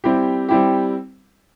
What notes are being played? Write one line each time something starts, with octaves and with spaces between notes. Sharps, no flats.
G3 C4 E4 G4
G3 C4 E4 G4